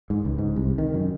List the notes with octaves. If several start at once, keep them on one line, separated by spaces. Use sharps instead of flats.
G#2
C#2
G#2
C2
D#3
F#2